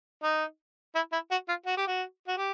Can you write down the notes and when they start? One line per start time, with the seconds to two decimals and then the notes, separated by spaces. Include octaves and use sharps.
0.23 D#4
0.95 E4
1.13 E4
1.31 F#4
1.48 F4
1.66 F#4
1.77 G4
1.87 F#4
2.28 F#4
2.37 G4